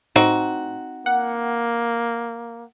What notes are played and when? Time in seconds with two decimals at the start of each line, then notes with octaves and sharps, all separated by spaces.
0.16 A2 C4 D#4 F#4
1.06 A#3 F#5